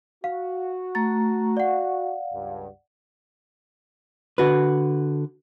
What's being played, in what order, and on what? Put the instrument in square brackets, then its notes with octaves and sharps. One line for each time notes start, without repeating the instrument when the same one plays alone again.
[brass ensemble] F#4 [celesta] F5
[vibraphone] A3 A#5 [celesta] A6
[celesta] D5 F#5 [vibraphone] F5
[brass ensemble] C#2 G2
[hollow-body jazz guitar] D3 F#4 B4